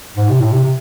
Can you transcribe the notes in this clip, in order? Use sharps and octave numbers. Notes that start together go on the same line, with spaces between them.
G#2
C3
A2
C3
C3